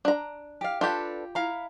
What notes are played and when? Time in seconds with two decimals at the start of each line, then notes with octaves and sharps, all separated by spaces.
0.05 D4 A#5
0.61 G4 F5
0.81 D4 F4 G4 A4 B4
1.35 E4 F5 A#5